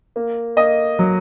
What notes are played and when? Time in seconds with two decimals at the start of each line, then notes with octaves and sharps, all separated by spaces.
0.16 A#3
0.57 A#3 D#5
0.99 F#3